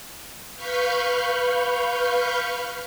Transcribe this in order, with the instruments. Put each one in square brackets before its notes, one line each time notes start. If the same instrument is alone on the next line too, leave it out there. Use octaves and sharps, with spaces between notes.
[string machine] B4 F5 B5 C#6 F6 G6